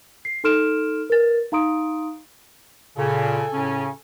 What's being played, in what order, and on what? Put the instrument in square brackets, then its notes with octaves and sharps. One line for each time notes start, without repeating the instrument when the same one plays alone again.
[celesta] C7
D#4 A4 C6 F6 D7 E7
A#4 B4 A6
D#4 F5 A#5 C6 D#6 D7
[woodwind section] A#2 C#3 [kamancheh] A4 G#5
[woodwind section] A2 C#3 C#4